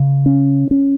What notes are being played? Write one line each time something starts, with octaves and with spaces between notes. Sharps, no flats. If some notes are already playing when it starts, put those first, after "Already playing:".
Already playing: C#3
C#4
C#4